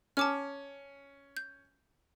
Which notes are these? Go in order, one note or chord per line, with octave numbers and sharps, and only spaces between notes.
C#4 A5 D6 F6
G6